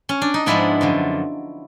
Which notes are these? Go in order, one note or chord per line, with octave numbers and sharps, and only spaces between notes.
C#4
D4
D#4
G#2 F3 G#3 B3 D4 E4
F#2 D3 F3